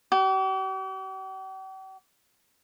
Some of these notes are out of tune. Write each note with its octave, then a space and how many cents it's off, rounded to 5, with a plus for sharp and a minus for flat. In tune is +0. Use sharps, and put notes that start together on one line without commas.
G4 -45